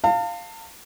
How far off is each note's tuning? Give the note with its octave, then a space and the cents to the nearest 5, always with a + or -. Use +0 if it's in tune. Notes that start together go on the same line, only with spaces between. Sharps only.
F5 +0 A5 +40